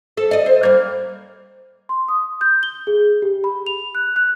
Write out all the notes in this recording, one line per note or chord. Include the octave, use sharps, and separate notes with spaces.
A4
D5 D#5
C5
G3 A#3
C6
D#6
G6
G7
G#4
G4
B5
F7
F#6
F#6